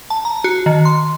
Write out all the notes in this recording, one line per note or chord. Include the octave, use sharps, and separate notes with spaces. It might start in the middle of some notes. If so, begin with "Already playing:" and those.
A5
A#5
F#4
D#3
C6